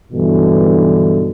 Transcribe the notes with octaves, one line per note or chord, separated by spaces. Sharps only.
B1 G2 B2 D3 E3